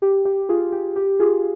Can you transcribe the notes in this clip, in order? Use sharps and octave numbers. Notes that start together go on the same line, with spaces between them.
G4
G4
F4 G#4
G4
G4
F4 G#4